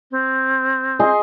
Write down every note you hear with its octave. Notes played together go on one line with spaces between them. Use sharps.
C4
G#4 D#5 C6